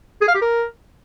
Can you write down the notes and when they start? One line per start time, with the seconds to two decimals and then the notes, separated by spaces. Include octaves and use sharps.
0.21 G#4
0.28 F5
0.35 G4
0.41 A#4